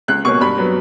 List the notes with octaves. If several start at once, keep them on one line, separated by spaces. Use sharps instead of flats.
C#2 F#6
B2 A#3 C#4 C#6
G2 B5
F#3 B3